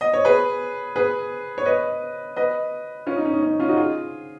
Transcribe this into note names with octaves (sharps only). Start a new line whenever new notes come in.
D#5
C#5
G#4 B4
G#4 B4
C#5
B4 D#5
B4 D#5
C#4 F4
D#4
C#4
D#4
C#4
C#4 F4
D#4 F#4
F4 G#4